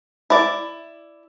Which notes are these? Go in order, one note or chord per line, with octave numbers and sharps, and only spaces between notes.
E4 D5